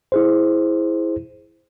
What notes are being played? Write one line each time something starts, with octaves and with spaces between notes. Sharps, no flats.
E4 G#4 C5